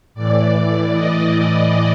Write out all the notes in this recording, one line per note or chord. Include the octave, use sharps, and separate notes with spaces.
A2 E3 D5
D#5